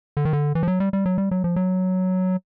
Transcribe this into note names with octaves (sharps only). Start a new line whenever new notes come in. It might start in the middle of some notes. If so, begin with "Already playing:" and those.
D3
D#3
D3
E3
F3
F#3
G3
G3
F#3
G3
F#3
F3
F#3